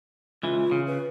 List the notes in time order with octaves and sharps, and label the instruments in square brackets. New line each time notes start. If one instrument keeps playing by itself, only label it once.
[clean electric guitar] C#2 E3 [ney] F4
[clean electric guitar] C#3
[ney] B4